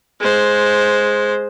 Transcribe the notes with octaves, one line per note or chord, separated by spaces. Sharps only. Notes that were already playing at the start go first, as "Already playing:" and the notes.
G#3 C5